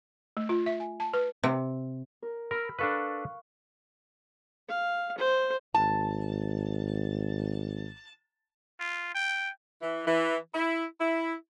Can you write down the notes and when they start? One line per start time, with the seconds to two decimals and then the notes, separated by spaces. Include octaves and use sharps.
0.37 A3
0.49 F4
0.66 E5
0.80 G#5
1.00 A5
1.13 B4
1.44 C3
2.22 A#4
2.51 A#4 B5 E6 F6
2.79 D4 A4 B4 F5 C#6 F#6
4.69 F5
5.18 C5
5.74 G#1 A5
8.80 F4
9.14 G5
9.82 E3
10.07 E3
10.54 E4
10.99 E4